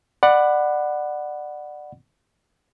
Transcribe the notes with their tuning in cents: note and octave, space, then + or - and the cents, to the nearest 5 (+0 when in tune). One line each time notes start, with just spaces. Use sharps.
D5 +25 F#5 +0 B5 +5